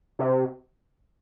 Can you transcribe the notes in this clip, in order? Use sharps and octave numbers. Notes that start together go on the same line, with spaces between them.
C3